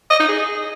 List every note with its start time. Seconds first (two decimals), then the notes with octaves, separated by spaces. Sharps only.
0.10 D#5
0.19 D#4
0.28 G#4